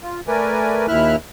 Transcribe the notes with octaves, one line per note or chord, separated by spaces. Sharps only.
F4
A3 A#4 B4 D5 G#5
D#2 A#2 E4 E5 F6 F#6